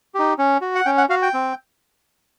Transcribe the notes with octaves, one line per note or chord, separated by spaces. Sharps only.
D#4 G4
C#4
F#4
F#5
C#4 G5
F#5
F#4 F5
G5
C4